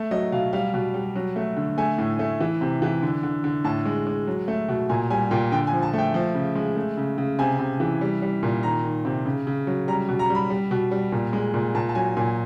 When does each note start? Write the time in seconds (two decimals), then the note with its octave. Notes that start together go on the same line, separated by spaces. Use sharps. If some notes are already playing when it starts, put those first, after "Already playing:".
Already playing: A3
0.11 F#3 D#5
0.32 B2 F5
0.53 G3 F5
0.74 B2
0.94 G3
1.16 F#3
1.36 A3
1.57 D3
1.78 A3 G#5
1.98 A2
2.19 A3
2.40 E3
2.61 C3
2.82 E3
3.02 D3
3.23 D3
3.44 D3
3.64 A2 A5
3.85 G#3
4.07 G#3
4.27 F#3
4.48 A3
4.68 B2
4.89 A#2 G#5
5.10 G3 G#5
5.31 A#2 G5
5.52 D3 G5
5.67 G#5
5.73 F3
5.82 A5
5.94 A3 G5
6.14 F3
6.34 C#3
6.55 G#3
6.76 A3
6.97 C#3
7.18 C#3
7.39 C3 G#5
7.59 C3
7.80 E3
8.01 G3
8.22 G3
8.43 A#2
8.63 D#3 A#5
8.83 D#3
9.05 C3
9.26 C#3
9.47 C#3
9.67 F#3
9.88 G3 A#5
10.09 B2
10.19 A#5
10.30 G3
10.35 B5
10.50 G3
10.71 B2
10.91 G3
11.12 A#2
11.33 G#3
11.54 A#2
11.75 A#2 A5
11.89 A5
11.95 F#3 G#5
12.16 A#2 G#5